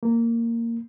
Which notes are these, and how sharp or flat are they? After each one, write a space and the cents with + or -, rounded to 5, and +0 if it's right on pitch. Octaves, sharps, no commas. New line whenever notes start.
A#3 -15